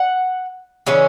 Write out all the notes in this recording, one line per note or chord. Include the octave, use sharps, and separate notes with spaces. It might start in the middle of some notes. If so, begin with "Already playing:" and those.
Already playing: F#5
C#3 E3 G#3 C#4